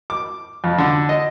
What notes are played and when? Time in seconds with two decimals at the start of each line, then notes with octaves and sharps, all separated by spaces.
0.10 D6
0.64 F2
0.78 D3
1.09 D#5